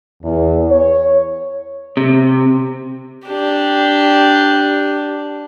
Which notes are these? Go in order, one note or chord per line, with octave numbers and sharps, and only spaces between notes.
E2
C#5
C3
D4 G4